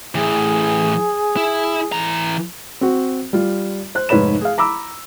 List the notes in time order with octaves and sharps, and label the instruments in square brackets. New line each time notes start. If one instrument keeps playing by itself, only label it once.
[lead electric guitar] A2 E3 [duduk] G#4
[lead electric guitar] E4
E3 A#5
[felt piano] C4 F#4
G3 F4
C5 F#6
F1 G#2 B4 C#5 B5 E7
G#4 F5
A#5 B5 D6 E6